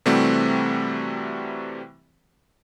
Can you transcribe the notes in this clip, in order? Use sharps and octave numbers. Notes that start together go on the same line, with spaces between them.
C3 E3 G3 A3 C4 F#4